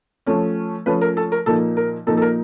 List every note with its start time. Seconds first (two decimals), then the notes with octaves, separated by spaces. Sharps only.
0.26 F3 A3 C#4
0.86 F3 A3 C#4 B4
1.01 A#4
1.17 A4
1.32 A#4
1.46 A#2 F3 A#3 D#4 A4
1.77 A#4
2.07 A#2 F3 A#3 D#4 A4
2.17 A4
2.22 A#4